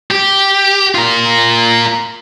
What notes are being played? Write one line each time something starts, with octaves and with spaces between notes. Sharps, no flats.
G4
F4 A#4